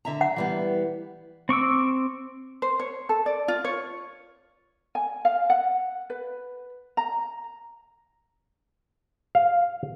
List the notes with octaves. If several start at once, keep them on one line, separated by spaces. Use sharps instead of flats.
D3 E5 A#5
F#5
E3 G3 B3
C4 C#6 D6 E6
C5
C#5
A4
D5
F4
C#5
G#5
F5
F#5
B4
A#5
F5